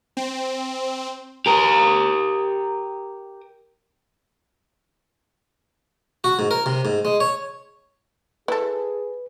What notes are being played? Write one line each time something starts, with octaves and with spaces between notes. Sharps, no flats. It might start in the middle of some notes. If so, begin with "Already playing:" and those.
C4
G4 A#4
F#4
G#2
A#4
C3
G#2
G#3
C#5
E4 G#4 A4 B4